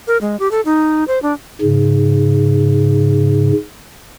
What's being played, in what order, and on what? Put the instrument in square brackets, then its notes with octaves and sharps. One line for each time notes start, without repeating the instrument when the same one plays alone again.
[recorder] A#4
G#3
G4
A4
D#4
C5
D4
[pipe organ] G#2 C#3